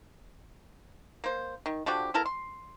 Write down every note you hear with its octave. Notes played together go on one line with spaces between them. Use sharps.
A#3 C5
D#3
D3 F3 F#4 G4
B3 E4 A4 A#4
C6